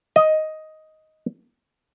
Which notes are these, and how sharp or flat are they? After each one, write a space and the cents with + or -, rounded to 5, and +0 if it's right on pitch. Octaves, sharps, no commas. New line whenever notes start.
D#5 +5